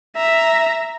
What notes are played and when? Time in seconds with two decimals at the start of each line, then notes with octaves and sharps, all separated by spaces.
0.16 E5 A#5